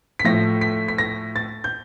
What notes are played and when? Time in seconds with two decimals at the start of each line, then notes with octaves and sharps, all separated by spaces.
0.19 B6
0.24 A2 F3 A3 A#6
0.61 B6
0.88 B6
0.98 A#6
1.36 A6
1.64 G6